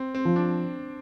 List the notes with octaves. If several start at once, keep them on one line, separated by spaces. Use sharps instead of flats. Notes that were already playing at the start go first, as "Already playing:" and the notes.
Already playing: C4
C4
F3
D4